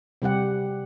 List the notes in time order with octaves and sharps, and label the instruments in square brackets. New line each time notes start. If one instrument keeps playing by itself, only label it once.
[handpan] C3 G3 G4 F#5